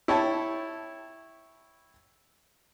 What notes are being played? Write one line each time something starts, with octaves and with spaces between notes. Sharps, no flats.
E4 C#5 G5 A5